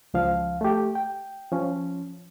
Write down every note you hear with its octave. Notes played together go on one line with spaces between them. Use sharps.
C#2 F3 F5
A3 G4
G5
F3 C#4